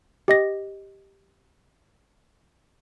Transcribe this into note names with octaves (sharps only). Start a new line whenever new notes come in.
G4 D#5 A#6